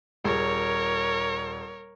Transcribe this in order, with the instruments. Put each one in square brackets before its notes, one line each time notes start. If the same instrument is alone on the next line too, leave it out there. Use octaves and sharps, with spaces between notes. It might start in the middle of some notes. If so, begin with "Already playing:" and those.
[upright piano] D#1 G#4 [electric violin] A#4 C#5